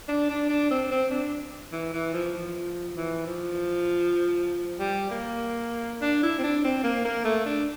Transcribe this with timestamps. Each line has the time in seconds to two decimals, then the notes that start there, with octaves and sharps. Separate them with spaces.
0.08 D4
0.30 D4
0.49 D4
0.71 C4
0.91 C4
1.11 D4
1.72 E3
1.93 E3
2.13 F3
2.34 F3
2.96 E3
3.26 F3
4.79 G3
5.11 A#3
6.02 D4
6.22 E4
6.38 C4
6.44 D4
6.64 C4
6.83 A#3
7.05 A#3
7.24 A3
7.45 D4